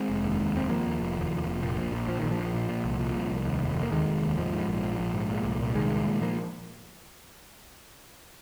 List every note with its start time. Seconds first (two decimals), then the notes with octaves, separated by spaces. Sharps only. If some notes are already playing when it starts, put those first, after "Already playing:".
Already playing: G#3 C4
0.09 F1
0.24 D#2
0.40 D#2
0.55 F1 C4
0.70 D#2 F3 A#3
0.86 D#2
1.01 F1
1.16 D#2
1.31 F1
1.47 F1
1.63 A#2
1.77 A#1
1.92 A#1
2.08 A#2 F3
2.19 A#1 D#3
2.31 F3
2.39 A#1
2.54 A#2
2.69 A#2
2.85 C2
2.99 A#2
3.16 C2
3.31 C2
3.45 D#2
3.61 F1
3.76 F1
3.83 A#3
3.92 D#2 D#3 G#3
4.07 F1
4.22 D#2
4.38 G#2 F3
4.53 G#2
4.69 A#1
4.84 A#1
4.99 A#1
5.14 G#2
5.29 A#2
5.45 C2
5.60 A#2
5.75 C2 D#3 G#3
5.91 A#2
6.05 A#2
6.22 F3 A#3